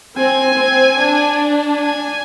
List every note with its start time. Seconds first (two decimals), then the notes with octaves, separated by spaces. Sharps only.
0.18 C4 G#5
0.57 C4
0.97 D4
1.76 G#5